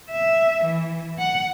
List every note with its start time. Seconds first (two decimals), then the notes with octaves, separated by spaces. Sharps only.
0.10 E5
0.64 E3
1.19 F#5